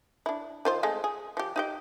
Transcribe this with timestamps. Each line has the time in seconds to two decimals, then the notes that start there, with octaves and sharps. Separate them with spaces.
0.26 D4 E4
0.65 D#3 F4 C5
0.83 G#3 A3 C4
1.04 G#4
1.37 F3 G4
1.56 D#4 G4 G5